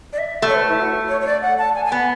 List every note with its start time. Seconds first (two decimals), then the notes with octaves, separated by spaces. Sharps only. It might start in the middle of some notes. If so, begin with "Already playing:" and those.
0.13 D5
0.18 E5
0.42 A3
0.48 C#5
0.55 B4
0.68 E4
0.80 F#4
1.09 C#5
1.21 C#5
1.26 D5
1.42 F#5
1.58 A5
1.75 G#5
1.85 G#5
1.92 B3 F#5